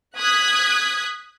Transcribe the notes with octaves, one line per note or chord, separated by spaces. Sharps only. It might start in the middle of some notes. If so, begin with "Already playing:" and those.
D#6 F#6 G#6 B6